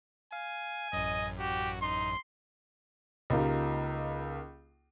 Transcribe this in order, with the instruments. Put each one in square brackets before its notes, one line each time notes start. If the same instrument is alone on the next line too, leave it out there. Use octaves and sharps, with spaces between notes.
[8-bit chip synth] F5 [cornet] G#5
[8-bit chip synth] A1 F#2 [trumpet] D#5
[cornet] F#4 [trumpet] G4
[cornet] D#4 [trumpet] C6
[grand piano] C#2 A#3 D#4 F4 G4